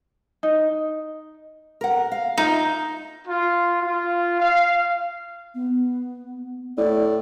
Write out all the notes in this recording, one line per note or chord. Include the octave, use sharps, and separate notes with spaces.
D#4
A#4 F#5
F5
D#4 F4 E5
F4
F4
F5
B3
A2 D5